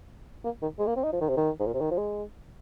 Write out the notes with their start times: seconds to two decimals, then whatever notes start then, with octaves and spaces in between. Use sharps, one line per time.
0.45 A#3
0.62 D#3
0.79 G#3
0.87 A#3
0.96 C4
1.04 D#4
1.13 F3
1.21 D#3
1.29 C3
1.37 D#3
1.59 G#2
1.67 A#2
1.74 C3
1.81 D#3
1.91 F3
1.98 G#3